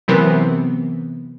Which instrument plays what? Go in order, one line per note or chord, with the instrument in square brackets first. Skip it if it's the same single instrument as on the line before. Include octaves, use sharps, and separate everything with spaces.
[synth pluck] C3 E3 F#3 B3 C4 A#4